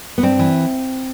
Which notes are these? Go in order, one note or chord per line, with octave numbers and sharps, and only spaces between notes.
B3
G2 C4
E3